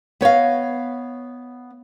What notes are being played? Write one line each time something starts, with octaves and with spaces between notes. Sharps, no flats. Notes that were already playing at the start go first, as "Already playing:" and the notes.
B3 C#5 D#5 F5